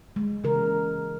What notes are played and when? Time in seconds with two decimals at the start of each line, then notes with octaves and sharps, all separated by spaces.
0.16 G#3
0.44 C#3 E3 A#4